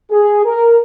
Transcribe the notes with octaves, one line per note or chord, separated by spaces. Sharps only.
G#4
A#4